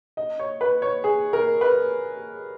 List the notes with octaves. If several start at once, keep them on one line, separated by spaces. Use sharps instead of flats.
D#5
C#5
B4
C#5
G#4
A#4
B4